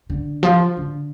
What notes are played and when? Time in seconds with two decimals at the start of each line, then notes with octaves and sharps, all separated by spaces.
0.10 D3
0.43 F3
0.77 D3